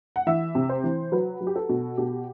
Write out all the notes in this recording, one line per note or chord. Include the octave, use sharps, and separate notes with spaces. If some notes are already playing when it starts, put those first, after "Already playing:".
F#5
E3 E5
C3
C5
E3
F#3 B4
F#3
G4
A4
B2
B2 G4